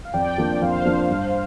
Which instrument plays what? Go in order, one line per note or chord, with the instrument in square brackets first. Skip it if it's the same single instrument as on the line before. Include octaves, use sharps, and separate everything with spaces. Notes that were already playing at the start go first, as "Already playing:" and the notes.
[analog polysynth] F5
[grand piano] F2 [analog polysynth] D5 G5
[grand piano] F3 A#3 D4
[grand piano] F2 [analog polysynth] C5 F5
[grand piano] F3 A#3 D4
G2